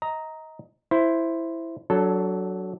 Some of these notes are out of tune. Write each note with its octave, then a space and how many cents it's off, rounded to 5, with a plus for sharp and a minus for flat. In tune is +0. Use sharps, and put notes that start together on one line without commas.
D#5 +25 A#5 +0
E4 +5 C5 +0
F#3 +10 D4 -20 A4 +0